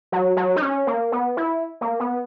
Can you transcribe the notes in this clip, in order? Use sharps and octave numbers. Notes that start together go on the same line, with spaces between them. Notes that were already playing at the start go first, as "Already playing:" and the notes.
F#3
F#3
D#4
C#4
A#3
B3
E4
A#3
B3